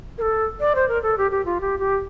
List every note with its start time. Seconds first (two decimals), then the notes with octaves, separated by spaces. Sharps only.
0.18 A#4
0.22 A4
0.60 D5
0.75 C5
0.88 A#4
1.03 A4
1.18 G4
1.31 G4
1.45 F4
1.61 G4
1.79 G4